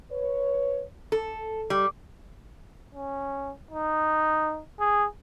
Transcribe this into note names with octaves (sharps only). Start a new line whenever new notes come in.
B4 C#5
A4
G3
C#4
D#4
G#4